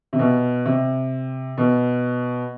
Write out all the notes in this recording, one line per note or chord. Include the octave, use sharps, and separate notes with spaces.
C3
B2
C3
B2